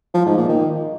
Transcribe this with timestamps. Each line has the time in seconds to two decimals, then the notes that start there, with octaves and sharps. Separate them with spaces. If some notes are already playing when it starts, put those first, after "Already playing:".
0.14 F3
0.26 G#2
0.37 A#2
0.49 D#3